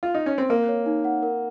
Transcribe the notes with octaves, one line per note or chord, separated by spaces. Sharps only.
F4
D#4
C#4
C4
A#3 A#4
C#5
D#4
F#5
A#4